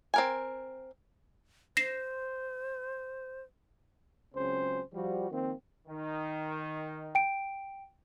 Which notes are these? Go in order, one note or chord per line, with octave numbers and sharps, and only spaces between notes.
C4 A#4 G#5
C5 A#6 C7 E7
C#2 C#3 F#3 C4 C#4 C5
F3 G3 F#4
D#3 F3 A#3 C4
D#3
G5 D7